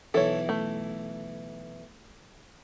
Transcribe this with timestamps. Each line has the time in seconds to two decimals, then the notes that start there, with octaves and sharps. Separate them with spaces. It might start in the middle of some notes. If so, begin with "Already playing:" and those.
0.14 B1 E3 A4 C#5
0.49 A3